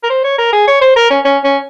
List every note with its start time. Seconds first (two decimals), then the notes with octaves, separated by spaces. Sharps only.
0.04 A#4
0.10 C5
0.24 C#5
0.38 A#4
0.53 G#4
0.67 C#5
0.81 C5
0.96 A#4
1.10 C#4
1.25 C#4
1.44 C#4